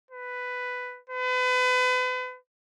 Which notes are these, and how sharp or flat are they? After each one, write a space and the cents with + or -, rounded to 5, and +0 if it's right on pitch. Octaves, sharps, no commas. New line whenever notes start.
B4 +10
B4 +35